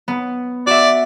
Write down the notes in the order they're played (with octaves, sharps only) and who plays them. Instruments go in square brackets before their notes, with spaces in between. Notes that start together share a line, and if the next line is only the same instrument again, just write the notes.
[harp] B3
[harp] F#4 E5 [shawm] D5